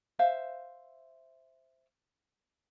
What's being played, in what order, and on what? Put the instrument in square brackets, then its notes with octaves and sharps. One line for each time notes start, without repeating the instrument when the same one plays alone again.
[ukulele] C5 E5 F5